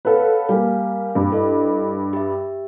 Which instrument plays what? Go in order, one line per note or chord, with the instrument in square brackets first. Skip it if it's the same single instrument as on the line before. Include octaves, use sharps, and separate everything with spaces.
[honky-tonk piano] A4 B4 [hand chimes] C#5 F5 F#5
[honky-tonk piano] G3 A#3 [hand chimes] F5 G#5
[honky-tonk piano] G2
[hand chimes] E4 A4 D#5
G4 E5